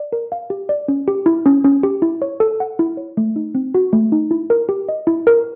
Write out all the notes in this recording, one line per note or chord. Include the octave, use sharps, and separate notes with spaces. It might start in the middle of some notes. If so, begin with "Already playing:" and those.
Already playing: D5
A#4
F5
G4
D5
C#4
G4
E4
C#4
C#4
G4
E4
C#5
A4
F#5
E4
C#5
A3
D#4
C4
F#4
A3
D#4
E4
A#4
G4
D#5
E4
A#4